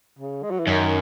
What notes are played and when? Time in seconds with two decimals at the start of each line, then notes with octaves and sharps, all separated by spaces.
0.19 C#3
0.43 G#3
0.51 F#3
0.59 E3
0.66 F#2 D#3